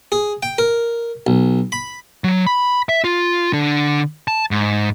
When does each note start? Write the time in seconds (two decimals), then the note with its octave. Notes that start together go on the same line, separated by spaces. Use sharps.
0.12 G#4
0.43 G5
0.58 A#4
1.27 B1
1.72 B5
2.24 F#3
2.47 B5
2.89 E5
3.04 F4
3.53 D3
4.28 A5
4.51 G#2